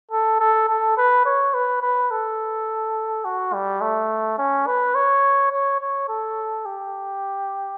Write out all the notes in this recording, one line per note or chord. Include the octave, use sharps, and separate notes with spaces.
A4
A4
A4
B4
C#5
B4
B4
A4
F#4
G3
A3
C#4
B4
C#5
C#5
C#5
A4
G4